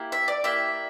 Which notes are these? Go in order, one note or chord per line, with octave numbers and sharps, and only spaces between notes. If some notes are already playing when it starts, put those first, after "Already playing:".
Already playing: A#3 E4 G4
E5
D5
A#3 E4 G4 E5